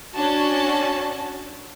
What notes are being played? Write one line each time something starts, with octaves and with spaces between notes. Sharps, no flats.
C#4 D4 F#4 A5